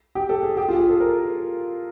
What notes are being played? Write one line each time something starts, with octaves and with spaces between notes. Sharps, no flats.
G4
A4
G#4
G4
F4
G#4
A4
A#4